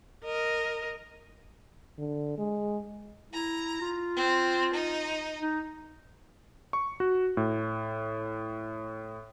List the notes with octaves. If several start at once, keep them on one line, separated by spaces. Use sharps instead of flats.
A#4 D#5
D3
G#3
E4 A#5
F4
C4
D#4
D#4
C#6
F#4
A2